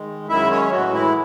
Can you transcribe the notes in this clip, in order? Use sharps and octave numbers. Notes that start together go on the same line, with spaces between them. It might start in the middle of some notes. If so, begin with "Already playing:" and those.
Already playing: D#3 G#3
F#2 D#3 G#3 E4 E5
C#4 C#5
A2 E3 F#3 G#3 F#4
E3 E4